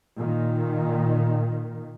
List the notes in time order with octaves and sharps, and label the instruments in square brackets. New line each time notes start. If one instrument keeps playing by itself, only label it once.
[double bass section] A#2 D#3